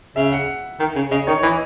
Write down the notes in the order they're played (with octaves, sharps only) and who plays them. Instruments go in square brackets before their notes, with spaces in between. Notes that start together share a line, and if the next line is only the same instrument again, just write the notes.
[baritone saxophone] C#3 [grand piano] E5
[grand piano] F#5
[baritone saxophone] D#3
C#3
[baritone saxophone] C#3 [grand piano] D#5
[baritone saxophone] D#3 [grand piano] C#5
[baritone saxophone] E3 [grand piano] D#5